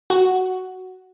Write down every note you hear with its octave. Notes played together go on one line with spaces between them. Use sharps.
F#4